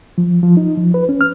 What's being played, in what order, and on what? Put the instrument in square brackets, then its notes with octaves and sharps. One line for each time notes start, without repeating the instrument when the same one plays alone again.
[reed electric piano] F3
F3
D#4
F3
B4
C#4
F6